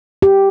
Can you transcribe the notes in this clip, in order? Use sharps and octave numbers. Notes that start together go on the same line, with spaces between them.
G4